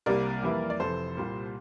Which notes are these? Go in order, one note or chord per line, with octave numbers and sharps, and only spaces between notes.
C2 C3 G3 A#3 A#4 D5
F2 E3 G3 A#3 E4
D5
F1 F2 E3 A4 C5
C2 A#2 G3 A#3